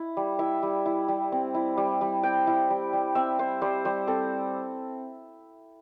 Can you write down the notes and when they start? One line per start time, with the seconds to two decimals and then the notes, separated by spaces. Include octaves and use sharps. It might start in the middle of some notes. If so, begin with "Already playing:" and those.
Already playing: E4
0.17 G3
0.39 E4 E5
0.63 G3
0.86 E4
1.08 G3
1.32 C4
1.54 E4
1.77 G3
2.01 G3
2.23 C4 G5
2.47 E4
2.70 G3
2.93 G3
3.15 C4 E5
3.39 E4 C5
3.62 G3 C5
3.85 G3 C5
4.07 C4 A4